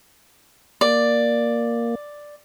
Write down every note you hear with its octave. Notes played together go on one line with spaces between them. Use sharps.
A#3 D5